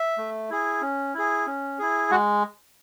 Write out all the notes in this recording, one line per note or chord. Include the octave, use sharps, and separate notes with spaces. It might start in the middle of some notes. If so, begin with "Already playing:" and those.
Already playing: E5
A3
E4 G#4
C#4
E4 G#4
C#4
E4 G#4
G#3 F#4 F#5